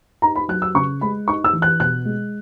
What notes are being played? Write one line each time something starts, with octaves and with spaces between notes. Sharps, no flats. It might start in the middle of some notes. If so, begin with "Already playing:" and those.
D#4 A#5
B5
F#3 F#6
E6
C#3 C#6
G#3 B5
D#4 C#6
E6
E3
F#6
B2 F#6
G#3